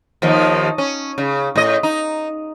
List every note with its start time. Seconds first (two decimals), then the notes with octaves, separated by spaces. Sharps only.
0.22 D#2 D#3 F3
0.78 C#4
1.18 C#3
1.56 A2 D#5
1.83 D#4